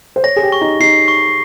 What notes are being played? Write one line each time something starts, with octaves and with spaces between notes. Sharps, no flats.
C5
C#5 A#6
G#4
G4
C#6
D#4
D#4 C7
C#6